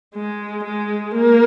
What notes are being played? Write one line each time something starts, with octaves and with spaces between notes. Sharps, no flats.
G#3
G#3
A#3